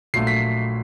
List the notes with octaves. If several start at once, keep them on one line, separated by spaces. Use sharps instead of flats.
A#1 A#2 F#3 A3 C7
B6